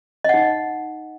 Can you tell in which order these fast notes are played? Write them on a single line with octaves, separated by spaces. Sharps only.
D#5 F#5 D#4